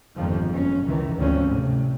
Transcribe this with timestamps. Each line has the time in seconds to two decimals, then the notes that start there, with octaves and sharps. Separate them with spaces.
0.15 G1 F2 G#2 D#3 F3
0.52 F#1 C#4
0.86 C#2 D#3 E3
1.16 G#1 D2 F3 C4 C#4
1.46 A2 C3